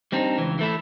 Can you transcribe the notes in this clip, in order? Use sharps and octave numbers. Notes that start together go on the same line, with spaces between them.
G3 C4 D4 D#4
C#2 E3
E3 A3 E4